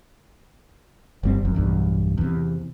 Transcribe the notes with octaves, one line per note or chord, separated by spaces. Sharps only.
G1 G3 C4
F1 F#2
B1 E2 G2
E2 C3